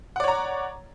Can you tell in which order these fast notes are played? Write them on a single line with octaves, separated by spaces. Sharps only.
F#5 D5 C#5 A#5